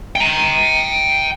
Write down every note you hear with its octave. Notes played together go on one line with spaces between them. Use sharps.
G5 A#5